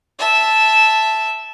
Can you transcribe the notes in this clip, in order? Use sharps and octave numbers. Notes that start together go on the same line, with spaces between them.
E5 A5